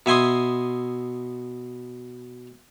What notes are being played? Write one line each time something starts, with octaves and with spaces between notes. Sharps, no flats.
B2 E5 G#5 C6 D#6